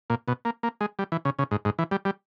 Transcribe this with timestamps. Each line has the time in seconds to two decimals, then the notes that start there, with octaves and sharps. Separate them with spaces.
0.10 A#2
0.28 B2
0.45 A#3
0.63 A#3
0.81 G#3
0.99 G3
1.12 E3
1.25 C#3
1.39 C#3
1.51 G#2
1.65 G#2
1.79 E3
1.91 G3
2.05 G3